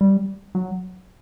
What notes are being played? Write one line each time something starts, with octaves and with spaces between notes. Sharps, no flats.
G3
F#3